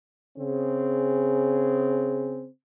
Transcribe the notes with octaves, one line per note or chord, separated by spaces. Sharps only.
C#3 C4 G#4